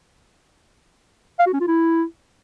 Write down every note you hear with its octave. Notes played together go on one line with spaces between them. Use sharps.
F5
F#4
C#4
F4
E4